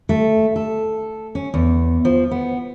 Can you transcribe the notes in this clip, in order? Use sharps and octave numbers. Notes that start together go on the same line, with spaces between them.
A3
A4
C#4
E2
F3
B3